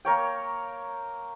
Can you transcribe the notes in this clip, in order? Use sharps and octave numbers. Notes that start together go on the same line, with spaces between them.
A#3 A#4 C#5 G5